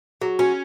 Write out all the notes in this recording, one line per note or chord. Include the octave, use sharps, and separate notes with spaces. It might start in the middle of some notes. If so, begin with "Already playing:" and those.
F#3 G#4
C#4 F#4